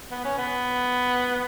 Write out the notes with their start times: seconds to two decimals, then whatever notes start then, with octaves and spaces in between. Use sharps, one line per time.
0.11 B3
0.25 C#4
0.38 B3